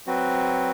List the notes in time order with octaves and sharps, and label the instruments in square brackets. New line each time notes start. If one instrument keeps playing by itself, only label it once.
[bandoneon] F#3 C4 F#4 B4